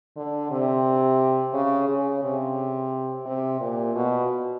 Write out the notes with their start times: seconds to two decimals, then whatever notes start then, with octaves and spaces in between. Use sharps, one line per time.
0.16 D3
0.51 C3
1.54 C#3
1.89 C#3
2.23 C3
3.26 C3
3.61 A#2
3.95 B2